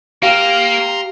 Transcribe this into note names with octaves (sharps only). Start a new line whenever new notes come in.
A#3 G4 F5 A#5 C6